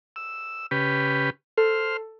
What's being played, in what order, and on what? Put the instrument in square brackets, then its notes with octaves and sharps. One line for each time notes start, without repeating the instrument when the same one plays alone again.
[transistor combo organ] E6
C#3 G4 B4
[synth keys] A4 [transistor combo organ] C5 F6